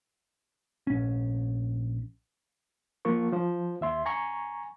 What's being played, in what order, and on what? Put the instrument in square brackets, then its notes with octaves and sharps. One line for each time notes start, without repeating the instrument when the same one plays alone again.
[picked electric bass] A#1 C#4
[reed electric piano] F3 A#3 F4 A#4 C#6
F3 C5
D#2 E5 C6
G#5 A#5 C#6